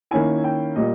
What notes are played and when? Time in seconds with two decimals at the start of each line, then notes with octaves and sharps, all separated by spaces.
0.11 D#3 A#3 C#4 E4 G#5
0.44 G5
0.76 A#2 G3 A#3 D#5